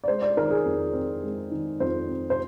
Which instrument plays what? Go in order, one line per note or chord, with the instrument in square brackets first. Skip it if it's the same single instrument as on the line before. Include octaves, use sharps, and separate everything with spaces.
[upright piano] D5
G#3 C5
D5
D#3 A#4
G#4
F2
C4
G#3
D#3
F2 C5
C4
C5